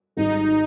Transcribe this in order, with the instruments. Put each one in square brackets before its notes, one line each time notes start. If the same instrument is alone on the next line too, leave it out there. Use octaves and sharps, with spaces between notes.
[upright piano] G#1 G#2 G3 [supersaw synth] D#4